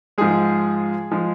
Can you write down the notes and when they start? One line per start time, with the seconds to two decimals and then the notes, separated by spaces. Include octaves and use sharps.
0.18 G#2 F3 G#3 G#4
1.11 F3 G#3